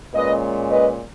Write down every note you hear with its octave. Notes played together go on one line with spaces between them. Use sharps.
A#2 G#3 C#4 B4 D#5
B4 D#5